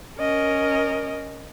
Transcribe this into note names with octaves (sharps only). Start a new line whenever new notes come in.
C#4 A#4 D#5